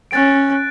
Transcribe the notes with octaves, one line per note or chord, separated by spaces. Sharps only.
C#4 F#6 A6 D7
F#6